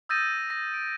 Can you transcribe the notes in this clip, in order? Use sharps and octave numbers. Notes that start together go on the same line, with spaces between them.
D#6 E6 G6 A6 A#6 D#7
A#6
D7